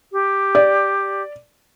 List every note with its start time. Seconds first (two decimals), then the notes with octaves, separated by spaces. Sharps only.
0.12 G4
0.55 D5